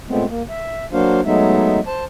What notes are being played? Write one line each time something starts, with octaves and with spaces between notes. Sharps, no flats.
A#2 G#3 A3 B3 C4
A#3
E5
F#3 A#3 D4 F#4 C5 F5
F#3 G#3 A3 B3 D#4 E5
C5 A5